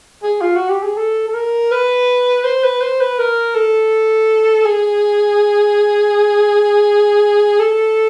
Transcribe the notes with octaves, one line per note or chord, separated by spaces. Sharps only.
G#4
F4
F#4
G4
G#4
A4
A4
A#4
B4
C5
B4
C5
B4
A#4
A4
G#4
A4